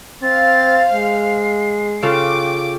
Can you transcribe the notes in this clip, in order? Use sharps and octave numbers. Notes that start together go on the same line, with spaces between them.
C4 C5 F5 A6
G#3 C7
C#3 F4 A4 G5 D6